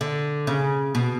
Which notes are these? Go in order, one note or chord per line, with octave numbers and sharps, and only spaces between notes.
D3
C#3
B2